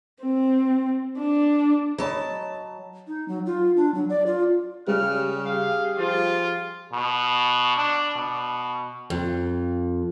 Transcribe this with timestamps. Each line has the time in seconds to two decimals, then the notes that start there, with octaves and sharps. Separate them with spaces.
0.21 C4
1.18 D4
1.98 F#3 C#5 D#5 A5 B5
3.08 D#4
3.28 F#3
3.46 F4
3.77 D4
3.94 F#3
4.09 D5
4.26 F4
4.88 C#3 G3 F6
5.46 G4 G#4 F5
5.98 F3 F4
6.92 B2
7.76 D4
8.15 B2
9.10 F2